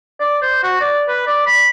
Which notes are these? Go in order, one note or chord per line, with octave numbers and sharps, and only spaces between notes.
D5
C5
F#4
D5
B4
D5
B5